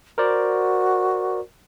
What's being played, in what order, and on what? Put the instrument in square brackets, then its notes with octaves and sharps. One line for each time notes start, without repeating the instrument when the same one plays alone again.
[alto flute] F#4 [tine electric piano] A#4 C5 D5